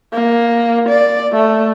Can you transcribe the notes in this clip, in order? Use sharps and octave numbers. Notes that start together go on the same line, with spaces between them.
A#3
D5
A3